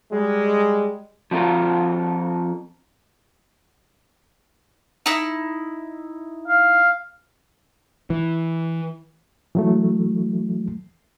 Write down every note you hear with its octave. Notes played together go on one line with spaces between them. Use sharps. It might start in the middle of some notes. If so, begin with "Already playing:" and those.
G3 G#3
F3 C4 F4 A4 A#4
D#4 E4
F5
E3
E3 F#3 A3